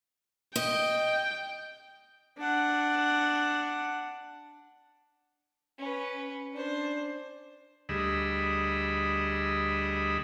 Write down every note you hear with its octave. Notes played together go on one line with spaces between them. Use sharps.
D#5 G5
D4 F#5
C#4 B4
D4 C5
D2 G3 G#4 D#5 B5 E6